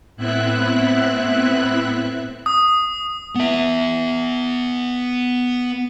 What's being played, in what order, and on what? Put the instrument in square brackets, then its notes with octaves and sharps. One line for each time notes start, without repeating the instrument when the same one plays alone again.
[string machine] A2 B3 C4 E4 E5 F#6
[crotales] D#6
[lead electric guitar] B3 E5